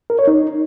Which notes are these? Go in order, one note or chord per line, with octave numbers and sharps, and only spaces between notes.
A#4
C#5
D#4